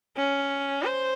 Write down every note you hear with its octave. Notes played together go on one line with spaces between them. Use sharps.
C#4
C5